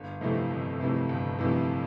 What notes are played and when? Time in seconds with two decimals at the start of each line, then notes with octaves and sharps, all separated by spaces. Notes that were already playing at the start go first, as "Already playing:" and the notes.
Already playing: G1
0.21 F2 C3 E3 A3
0.51 G1
0.80 F2 C3 E3 A3
1.09 G1
1.39 F2 C3 E3 A3